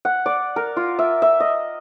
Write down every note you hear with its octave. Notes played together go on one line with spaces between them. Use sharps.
F#5
D5
A#4
F4
E5
E5
D#5